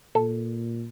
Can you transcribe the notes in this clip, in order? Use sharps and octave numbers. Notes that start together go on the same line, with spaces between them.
A#2 A4